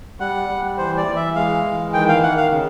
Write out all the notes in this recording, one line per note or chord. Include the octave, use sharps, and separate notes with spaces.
G3 F#5
G3
E3 C5
D5
E3
E5
G#3 F5
E3
D#3 G5
F5
D#3 F#5
F5
C#3